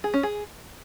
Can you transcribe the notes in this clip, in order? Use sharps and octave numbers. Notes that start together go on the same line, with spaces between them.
G#4
C#4
G#4